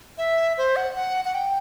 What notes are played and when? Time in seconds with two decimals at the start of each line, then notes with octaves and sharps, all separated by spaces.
0.18 E5
0.58 C5
0.76 F#5
0.95 F#5
1.25 F#5
1.34 G5